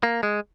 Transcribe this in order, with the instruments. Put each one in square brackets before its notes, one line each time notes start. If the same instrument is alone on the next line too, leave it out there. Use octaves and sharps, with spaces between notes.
[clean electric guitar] A#3
G#3